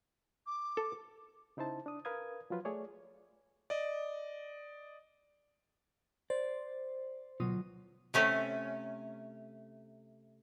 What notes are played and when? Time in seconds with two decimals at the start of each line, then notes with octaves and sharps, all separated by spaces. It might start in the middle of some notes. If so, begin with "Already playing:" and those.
0.47 D6
0.77 A4
1.57 C#3 D#4 E4 C5 A5
1.86 D4 D#6
2.05 A#4 B4 F5 D#6 G#6
2.50 F3 F#3 F4 B4
2.65 A3 G#4 C#5 D5
3.70 D5 D#5
6.30 C5 D5
7.40 D2 B2 F#3 F4 D#6
8.14 C3 A3 C#4